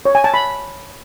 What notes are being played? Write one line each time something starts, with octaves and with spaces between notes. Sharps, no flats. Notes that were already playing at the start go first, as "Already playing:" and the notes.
C#5
G#5
A5
B5